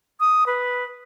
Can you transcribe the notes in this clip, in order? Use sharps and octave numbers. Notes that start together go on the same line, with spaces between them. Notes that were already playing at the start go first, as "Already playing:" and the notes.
D#6
B4